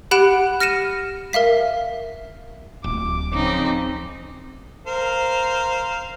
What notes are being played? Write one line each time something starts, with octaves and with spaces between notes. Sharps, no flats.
G4 F#5 B5 F#6 D7 E7
F6 A#6 C#7 D#7 E7
A#4 E5 F5 B6
D1 D6
C#3 F3 C4 D#4
A#4 C5 F5